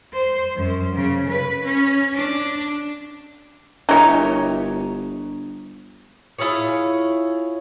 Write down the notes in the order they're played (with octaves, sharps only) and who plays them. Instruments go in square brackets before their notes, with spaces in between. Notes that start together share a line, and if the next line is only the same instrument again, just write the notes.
[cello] C5
F#2
C#3
B4
C#4
D4
[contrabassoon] G1 [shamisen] E3 A#4 E5 [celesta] D4 [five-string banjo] D#4 C#5
[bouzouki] E4 F4 G#4 C#5